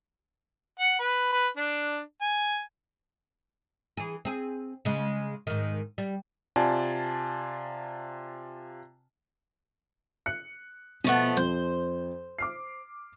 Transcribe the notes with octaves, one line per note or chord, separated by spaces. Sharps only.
F#5
B4
B4
D4
G#5
E3 G#4
C4 G#4
C#3 G#3
G#2 D#3
G3
C3 F4 D5 G#5 A5
F#6 C#7
B2 F3 A3 B3
F2 F3 C5 G6
D6 F6 C7